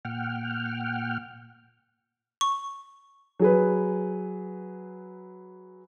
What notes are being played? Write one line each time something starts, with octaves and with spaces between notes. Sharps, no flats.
A#2 F#5 G5 F6
C#6
F#3 G#4 B4